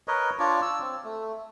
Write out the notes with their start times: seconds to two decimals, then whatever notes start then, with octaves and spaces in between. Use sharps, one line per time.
0.08 A#4 B4 C#5 D#5
0.39 D4 F4 C#5 D5
0.62 E6
0.80 C4
1.04 A3